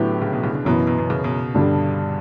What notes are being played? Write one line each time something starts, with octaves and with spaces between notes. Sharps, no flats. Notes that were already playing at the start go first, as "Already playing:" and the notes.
Already playing: A2 D3 F#3 B3 E4 G4
C#3
B2
C#3
D3
F#2 B2 E3 B3
B2
B2
C#3
B2
G2 D3 G3